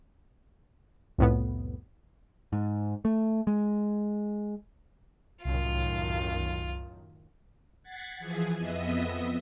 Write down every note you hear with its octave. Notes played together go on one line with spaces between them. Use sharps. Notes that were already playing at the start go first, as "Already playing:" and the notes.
C2 F2 A2 B3
G#2
A3
G#3
C2 F#2 A2 D#3 F4
F#5 G#6 A6 B6 C7
E3 F3 G#4
F2 B3 D#5 E5 D#6